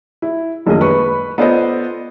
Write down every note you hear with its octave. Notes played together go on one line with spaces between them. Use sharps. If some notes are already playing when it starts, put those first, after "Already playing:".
E4
D#1 A#1 F#2 G#3 A#3 D#5
B4 B5 C#6
B3 F4 A4 C5 D5 D#5